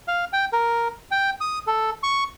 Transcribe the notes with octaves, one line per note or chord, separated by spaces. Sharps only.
F5
G5
A#4
G5
D#6
A4
C#6